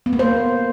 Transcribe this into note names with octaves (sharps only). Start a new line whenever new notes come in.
B3
A#3
C5